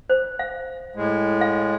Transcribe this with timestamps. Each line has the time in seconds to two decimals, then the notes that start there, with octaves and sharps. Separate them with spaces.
0.10 C5
0.39 F5
0.96 A2 G#3
1.41 F5